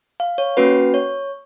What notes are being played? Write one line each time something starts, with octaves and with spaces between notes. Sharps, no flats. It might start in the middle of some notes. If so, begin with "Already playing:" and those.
F5
C#5
A#3 C#4 F#4 B4
C#5